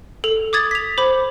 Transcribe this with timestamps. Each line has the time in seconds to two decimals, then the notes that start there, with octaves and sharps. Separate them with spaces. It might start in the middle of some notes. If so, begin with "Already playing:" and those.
0.24 A4 F7
0.53 D6 D#6 G#6 A6
0.71 B6 F7
0.98 C5 B5 D6